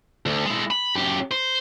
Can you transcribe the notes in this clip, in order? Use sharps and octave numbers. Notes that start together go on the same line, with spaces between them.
D2
G#3 E4
B5
F#2 G4
C5